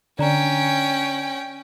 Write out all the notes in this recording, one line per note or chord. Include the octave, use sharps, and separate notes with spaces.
D3 C#4 D5 G5 A#5